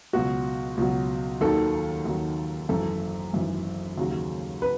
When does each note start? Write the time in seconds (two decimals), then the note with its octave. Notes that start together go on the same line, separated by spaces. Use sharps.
0.13 C#2 B2 F#3 F#4
0.77 C#2 B2 F#3
1.41 D#2 D#3 F#3 A4
2.05 D#2 D#3 F#3
2.69 G#1 F#2 E3 A4
3.33 G#1 F#2 E3
3.98 D#2 C#3 F#3
4.62 B4